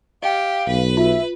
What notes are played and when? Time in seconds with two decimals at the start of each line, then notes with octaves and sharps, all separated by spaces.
0.23 G4 D#5 F5 G5
0.68 B1 B4
0.97 F4 E5